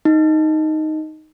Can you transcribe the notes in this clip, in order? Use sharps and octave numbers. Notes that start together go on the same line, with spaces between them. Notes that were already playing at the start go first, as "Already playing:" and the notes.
D#4